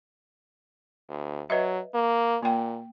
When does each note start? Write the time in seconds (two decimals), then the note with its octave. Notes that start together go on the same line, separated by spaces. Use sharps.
1.09 D2
1.50 F#3 B4 D#5 E5
1.94 A#3
2.43 A#2 A#3 G5